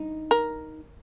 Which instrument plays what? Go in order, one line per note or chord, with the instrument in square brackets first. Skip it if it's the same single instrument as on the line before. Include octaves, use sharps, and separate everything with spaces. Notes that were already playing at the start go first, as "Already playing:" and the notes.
Already playing: [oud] D#4
[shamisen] A#4